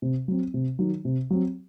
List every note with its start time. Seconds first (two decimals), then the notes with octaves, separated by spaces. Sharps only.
0.02 C3
0.28 F#3 C4
0.54 C3
0.79 D#3 F#3
1.05 C3
1.30 F#3 C4